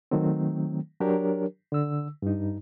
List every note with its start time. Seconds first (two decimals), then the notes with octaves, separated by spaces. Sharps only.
0.11 D#3 F#3 A3 C4
1.00 F#3 D4 G4 A#4 C#5
1.72 D3 E6
2.22 G2 D#4